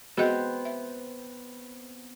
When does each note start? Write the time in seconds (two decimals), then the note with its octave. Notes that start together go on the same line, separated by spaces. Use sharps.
0.17 B3 C4 F#4 G#4 D#5
0.65 E5